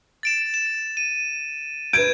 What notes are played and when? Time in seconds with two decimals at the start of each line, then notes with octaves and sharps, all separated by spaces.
0.23 A6 D7 E7
0.54 E7
0.97 D#7
1.93 B4 G6 G#6 D7